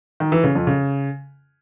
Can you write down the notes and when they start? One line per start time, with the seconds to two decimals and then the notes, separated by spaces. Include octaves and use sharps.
0.20 D#3
0.32 E3
0.44 C#3
0.55 F2
0.67 C#3